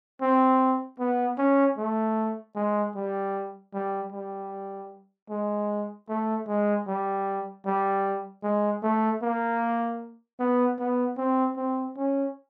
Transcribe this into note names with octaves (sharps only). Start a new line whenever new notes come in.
C4
B3
C#4
A3
G#3
G3
G3
G3
G#3
A3
G#3
G3
G3
G#3
A3
A#3
B3
B3
C4
C4
C#4